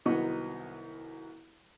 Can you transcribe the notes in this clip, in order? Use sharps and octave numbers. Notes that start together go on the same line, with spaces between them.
C2 D#3 F#3 B3 D#5 C#6